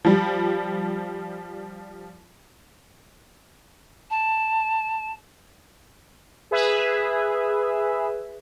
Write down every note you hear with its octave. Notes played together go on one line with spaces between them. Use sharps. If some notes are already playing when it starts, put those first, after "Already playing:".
F3 G3
A5
G#4 B4 E5